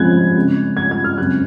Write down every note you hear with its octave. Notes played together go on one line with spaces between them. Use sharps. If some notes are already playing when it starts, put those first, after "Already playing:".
Already playing: F3 G#3 C4 F#6 G#6
C#3 G#3 C4
G#6
G#6
F6
F#2 C#3 G#3 C4 F#6